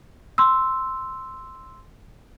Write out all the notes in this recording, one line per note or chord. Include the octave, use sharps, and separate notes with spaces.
C6 E6